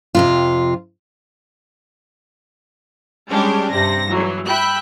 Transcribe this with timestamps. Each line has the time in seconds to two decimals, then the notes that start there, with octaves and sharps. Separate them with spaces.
0.15 F2 C3 F4
3.29 G3 G#3 C#4 D4 G4
3.73 G2 C3 A#6
4.09 E3 F#3
4.47 E5 G5 B5 F#6